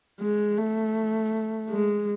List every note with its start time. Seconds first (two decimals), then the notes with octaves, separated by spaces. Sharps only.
0.20 G#3
0.57 A3
1.69 G#3